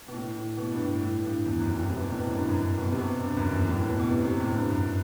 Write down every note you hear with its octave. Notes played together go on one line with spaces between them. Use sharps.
B2
A2
A2
B2
G2
A2
A2
G2
E2
F#2
A2
C3
B2
A2
B2
F#2
G2
F#2
B2
C3
B2
G2
F#2
E2
A2
A2
B2
B2
C3
C3
A2
G2
F#2